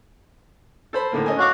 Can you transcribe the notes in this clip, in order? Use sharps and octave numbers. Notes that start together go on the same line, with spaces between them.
A4 C5 B5
A2 D3 A#3
C#4 D#5 G#5
F#4 C#5 F5 D6